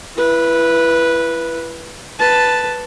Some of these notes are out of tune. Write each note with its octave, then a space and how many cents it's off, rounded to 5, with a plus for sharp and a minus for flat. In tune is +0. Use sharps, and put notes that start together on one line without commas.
E4 +25 B4 -10
B4 +0 A5 +0